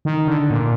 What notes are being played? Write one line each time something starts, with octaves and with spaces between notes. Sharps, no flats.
D#3
D3
A#2